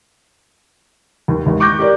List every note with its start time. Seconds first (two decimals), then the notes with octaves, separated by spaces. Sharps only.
1.28 D#2
1.46 G#1 D#2
1.60 C#6 D6 F#6 G6 A#6
1.79 G4 A#4 D5